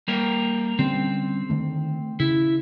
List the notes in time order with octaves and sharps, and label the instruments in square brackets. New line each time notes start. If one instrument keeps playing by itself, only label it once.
[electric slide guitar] G3 A#3 A#4
[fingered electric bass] D3 G3 C#4 [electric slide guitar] C4
[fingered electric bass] D3 D#3 A3
[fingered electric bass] C#3 [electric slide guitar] E4